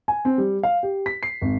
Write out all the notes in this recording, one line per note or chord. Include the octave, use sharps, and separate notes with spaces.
G#5
C4
G3
F5
G4
B6
C7
G#1